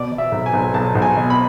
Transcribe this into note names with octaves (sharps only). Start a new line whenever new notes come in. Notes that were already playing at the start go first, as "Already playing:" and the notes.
Already playing: B2 D5
B2
E5
B1
G#5
B1
B1 A5
B1
G#5
B2
B5